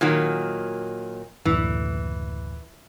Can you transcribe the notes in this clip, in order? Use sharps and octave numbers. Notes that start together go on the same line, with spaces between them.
A#2 D#3 F#3
F#1 D2 A2 E3